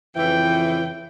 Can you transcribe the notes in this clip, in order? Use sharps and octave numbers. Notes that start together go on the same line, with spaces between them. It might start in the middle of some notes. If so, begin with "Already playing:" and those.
F2 C#3 E3 G5